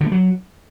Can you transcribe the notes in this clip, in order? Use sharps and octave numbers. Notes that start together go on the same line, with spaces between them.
D3
A3
F#3